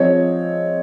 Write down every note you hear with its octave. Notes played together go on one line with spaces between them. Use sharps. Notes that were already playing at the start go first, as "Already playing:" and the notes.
Already playing: F3 G#3 C4 C#5 D#5